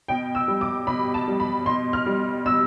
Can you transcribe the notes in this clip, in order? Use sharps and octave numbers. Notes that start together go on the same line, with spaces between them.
B2 G5
E6
G3
D6
B2 B5
A5
G3
B5
B2 C6
F6
G3
B2 E6